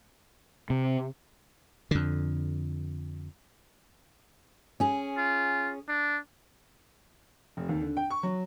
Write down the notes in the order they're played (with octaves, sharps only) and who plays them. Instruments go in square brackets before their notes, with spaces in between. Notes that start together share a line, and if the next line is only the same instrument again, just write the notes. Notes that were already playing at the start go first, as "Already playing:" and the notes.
[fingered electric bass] C3
[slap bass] F2 D3
[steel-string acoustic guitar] C#4 G#4
[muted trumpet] F4
D4
[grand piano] F1
D#2
D3
G5
C#6
F#3